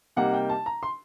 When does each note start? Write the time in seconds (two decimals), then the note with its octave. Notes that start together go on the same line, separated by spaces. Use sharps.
0.16 C3 G3 A#3 D#4 F#5
0.33 G5
0.49 A5
0.66 A#5
0.83 C6